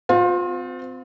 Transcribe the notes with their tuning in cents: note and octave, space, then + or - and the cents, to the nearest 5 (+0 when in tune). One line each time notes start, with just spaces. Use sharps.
C4 -25 F4 +30